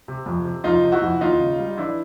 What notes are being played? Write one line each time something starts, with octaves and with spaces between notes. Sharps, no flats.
C3
F2
C3
F2 D#4 F4
C3
E4 F#4
F2
D#2 D#4 F4
C#3
G3
E3 D4 E4